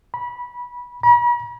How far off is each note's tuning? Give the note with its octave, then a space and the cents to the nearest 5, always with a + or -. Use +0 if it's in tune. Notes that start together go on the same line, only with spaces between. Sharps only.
B5 -20
B5 -45